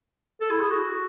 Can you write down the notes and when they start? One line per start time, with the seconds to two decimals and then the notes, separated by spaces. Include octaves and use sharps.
0.41 A4
0.51 E4
0.61 G#4
0.71 F#4